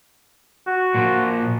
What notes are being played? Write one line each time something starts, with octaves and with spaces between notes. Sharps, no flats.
F#4
A#2 F3